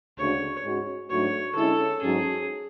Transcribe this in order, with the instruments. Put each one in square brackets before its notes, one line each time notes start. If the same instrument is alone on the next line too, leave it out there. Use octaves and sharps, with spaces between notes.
[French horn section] D2 C#3 G#3 D4 F#4 [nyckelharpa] C#5
[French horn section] G#2 G#3 C#4 F#4
[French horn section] G#2 F#3 A3 D4 F#4 [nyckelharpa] C#5
[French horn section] D3 G#3 C#4 E4 [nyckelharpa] A4
[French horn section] G#2 F#3 C#4 [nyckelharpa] G#4